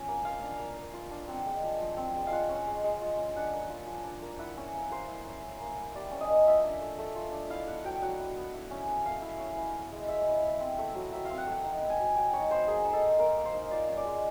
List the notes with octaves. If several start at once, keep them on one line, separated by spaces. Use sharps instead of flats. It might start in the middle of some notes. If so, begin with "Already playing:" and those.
Already playing: F3 C#4
A#3
F4 F5
D4
A#3
A#3
F4
D4
C4 F#5
G#3
F3
F3
C4
G#3
F5
F4 F#5
C#4
G#3
G#3
F4
C#4
D4 F#5
A#3
F4
F3
D4
A#3
E4 F#5
C#4
A#3
A#3 C5
E4
C#4
C#4
A#3
E4
G3 D5
C#4
D#5
A#3
F4 E5
D4
A3
A3
F4
D4
E4 F5
B3 F#5
F#3 G5
F#3 F#5
E4
B3
E4
C#4
A3
A3 F5
E4
C#4
E4
B3
G#3
G#3 E5
E4
B3
C4
A3
F#3
F#3 E5
C4 F5
F#5
A3
F#5
D#4 G5
B3
G#5
F#3
F#3 G5
D#4 C#5
B3 C5
A#3 G#4
D#4
A4
D#4
A#3 A#4
A#3
C5
D#4
F4 D5
C#4
D5
G#3